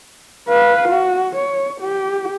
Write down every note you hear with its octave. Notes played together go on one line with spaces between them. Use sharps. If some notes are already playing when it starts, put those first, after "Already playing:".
B4 F5
F#4
C#5
G4